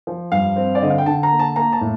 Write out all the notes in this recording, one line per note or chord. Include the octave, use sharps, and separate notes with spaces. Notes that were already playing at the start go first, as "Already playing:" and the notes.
F3
G2 F5
C4
D5
D3 D#5
F5
G5
D3 A5
A#5
A#3
A5
A#3 A#5
A5
A2